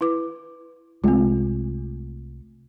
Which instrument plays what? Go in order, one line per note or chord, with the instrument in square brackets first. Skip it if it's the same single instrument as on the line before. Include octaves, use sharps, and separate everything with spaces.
[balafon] E4 B4 D6
[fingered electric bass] C2 G#3 A3 [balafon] C4 F4